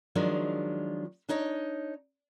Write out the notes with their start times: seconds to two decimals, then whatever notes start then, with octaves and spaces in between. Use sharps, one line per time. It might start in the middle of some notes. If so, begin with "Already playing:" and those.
0.15 D#3 F3 F#3 G#3 D4 F4
1.29 D4 D#4 C#5 D#5